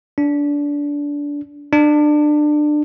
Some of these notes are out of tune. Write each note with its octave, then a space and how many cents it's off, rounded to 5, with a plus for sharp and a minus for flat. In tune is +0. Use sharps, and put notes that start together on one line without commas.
D4 -20
D4 +25